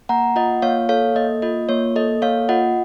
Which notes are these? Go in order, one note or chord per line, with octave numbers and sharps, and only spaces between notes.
A#3 F#5 A#5
F4 D#5 F#5
A#3 C#5 F5
A4 C#5 F5
A#3 D#5
F4 D#5
A#3 C#5
A4 D#5
A#3 C#5 F5
F4 D#5 F#5